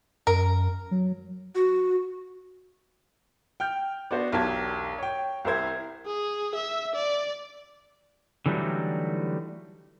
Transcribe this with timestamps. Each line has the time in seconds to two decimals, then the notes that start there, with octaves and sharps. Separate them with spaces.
0.27 F#2 A#4
0.91 F#3
1.55 F#4
3.60 G5 F6 G6
4.11 B3 D4 F#4 C5
4.32 E1 B1 G4 A#4 A5 G#6
4.98 C#5 G5
5.45 C2 E4 A#4 C5 G#6
6.06 G#4
6.55 E5
6.95 D5
8.46 D3 E3 F#3 G3 A3 D#4